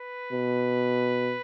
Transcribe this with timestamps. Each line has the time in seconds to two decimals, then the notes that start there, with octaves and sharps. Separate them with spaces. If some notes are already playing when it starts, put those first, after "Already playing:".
Already playing: B4
0.32 B2